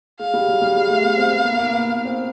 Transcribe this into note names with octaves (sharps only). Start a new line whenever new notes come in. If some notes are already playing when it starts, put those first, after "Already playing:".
G#3 F5
G3
F#3
G3
G#3
A3
B3
C4
B3
A#3
A#3
B3
C4